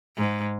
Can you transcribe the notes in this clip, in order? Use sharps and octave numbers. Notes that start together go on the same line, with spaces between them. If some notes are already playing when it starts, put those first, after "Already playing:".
G#2